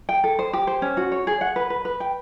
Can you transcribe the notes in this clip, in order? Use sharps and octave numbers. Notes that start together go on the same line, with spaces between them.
G5
A4
C5
G4
C5
C#4
F#4
C#5
G#4
F#5
B4
B4
B4
G5